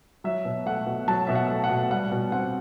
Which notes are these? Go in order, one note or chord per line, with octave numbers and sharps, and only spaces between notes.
F#3 E5
B2
A3 F#5
B2
F#3 A5
B2 E5
F#5
A3
F#5
B2
G3 F#5
B2
C4 F#5